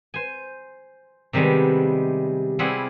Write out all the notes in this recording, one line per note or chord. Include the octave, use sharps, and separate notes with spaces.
C5 G#5
C3 D#3 G3 G#3 B3
G3 C4 E4 F4 G#4 F#5